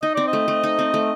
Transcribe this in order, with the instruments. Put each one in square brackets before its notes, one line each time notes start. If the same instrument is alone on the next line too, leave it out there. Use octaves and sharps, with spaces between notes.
[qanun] D#4 [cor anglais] D#5
[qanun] C4 [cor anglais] D5
[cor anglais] D#5
[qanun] A3
A3
D#4
C4
A3